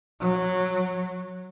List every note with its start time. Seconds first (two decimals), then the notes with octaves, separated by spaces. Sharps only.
0.21 F#3